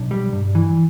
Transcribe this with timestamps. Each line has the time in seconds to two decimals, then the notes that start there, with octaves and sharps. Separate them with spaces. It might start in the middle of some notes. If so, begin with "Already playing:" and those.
Already playing: B1 D4
0.11 G3
0.33 G2
0.55 E3